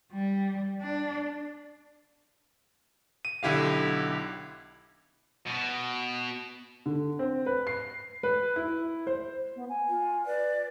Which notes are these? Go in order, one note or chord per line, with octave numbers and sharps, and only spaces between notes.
G3
D4
D#7
B1 D3 E4 G4 F5
B2
D3
C4
B4
C7
B4
E4
C5
B3
G#5
F4
B4 D5